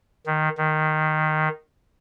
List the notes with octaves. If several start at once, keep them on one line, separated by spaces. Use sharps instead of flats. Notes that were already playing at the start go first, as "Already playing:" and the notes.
D#3
D#3